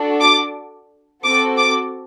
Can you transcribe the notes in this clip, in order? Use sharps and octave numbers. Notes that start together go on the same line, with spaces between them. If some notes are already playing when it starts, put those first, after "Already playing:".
Already playing: D4 F#4 A4
D6
C4 F#4 A4 D6
D6